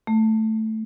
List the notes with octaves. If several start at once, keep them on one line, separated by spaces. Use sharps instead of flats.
A3